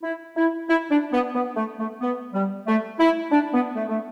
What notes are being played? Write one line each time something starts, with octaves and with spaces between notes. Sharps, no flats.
E4
E4
E4
D4
B3
B3
A3
A3
B3
G3
A3
E4
D4
B3
A3
A3